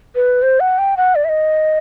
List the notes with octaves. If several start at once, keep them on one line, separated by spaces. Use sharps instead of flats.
B4
C5
F#5
G5
F#5
D5
E5
D#5